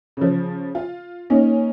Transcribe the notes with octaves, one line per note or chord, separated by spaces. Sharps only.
C#3 F3
F4
A#3 C#4 D#4